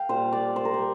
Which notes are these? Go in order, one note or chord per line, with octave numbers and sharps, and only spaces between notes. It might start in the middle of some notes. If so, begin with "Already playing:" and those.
Already playing: F5 G5
A#2 G3 C5
D5
C5
A#4
G3 C5